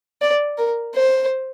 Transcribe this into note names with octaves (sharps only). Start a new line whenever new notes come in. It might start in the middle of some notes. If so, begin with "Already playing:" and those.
D5
A#4
C5